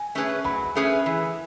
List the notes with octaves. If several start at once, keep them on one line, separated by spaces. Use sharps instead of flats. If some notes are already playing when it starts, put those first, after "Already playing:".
Already playing: G#5
A3 C#4 G#4 B4
F#3 B5
A3 C#4 G#4 B4
E3